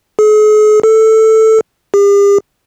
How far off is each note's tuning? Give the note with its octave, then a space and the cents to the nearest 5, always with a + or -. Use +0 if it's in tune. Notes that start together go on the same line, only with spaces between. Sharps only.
G#4 +45
A4 +5
G4 +45